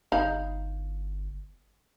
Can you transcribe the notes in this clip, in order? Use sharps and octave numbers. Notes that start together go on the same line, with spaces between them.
G1 D#4 F5 B5